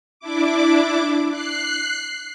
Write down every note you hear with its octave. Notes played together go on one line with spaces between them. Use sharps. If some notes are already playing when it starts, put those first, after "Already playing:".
D4 E4 D6
F#6 C7